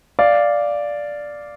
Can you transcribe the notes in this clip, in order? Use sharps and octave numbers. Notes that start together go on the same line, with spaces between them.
D5 F5